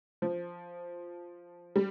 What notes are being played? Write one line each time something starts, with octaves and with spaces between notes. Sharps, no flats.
F3
G3